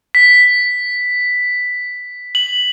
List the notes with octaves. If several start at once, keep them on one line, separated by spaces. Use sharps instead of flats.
B6
F#7